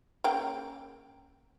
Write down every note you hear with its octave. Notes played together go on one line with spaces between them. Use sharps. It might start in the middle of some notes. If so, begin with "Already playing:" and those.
C#3 A#3 G5